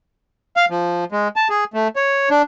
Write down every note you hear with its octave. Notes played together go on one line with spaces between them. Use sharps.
F5
F3
G#3
A5
G#4
A3
C#5
D4